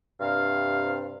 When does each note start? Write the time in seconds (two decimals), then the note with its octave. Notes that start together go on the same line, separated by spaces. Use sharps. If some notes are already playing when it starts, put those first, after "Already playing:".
0.21 G2 C3 F5